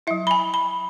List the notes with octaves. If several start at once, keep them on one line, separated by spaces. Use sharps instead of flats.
F#3 E4 E5
B5
G#5
B5